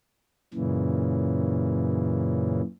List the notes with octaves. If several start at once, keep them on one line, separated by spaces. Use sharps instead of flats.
F#2 A#2 C#3 E3